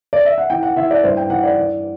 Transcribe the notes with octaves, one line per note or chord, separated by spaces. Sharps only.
D5
E5
F#5
E3 G5
F#5
E3 E5
D5
G2 C5
G5
E3 F#5
D5
E3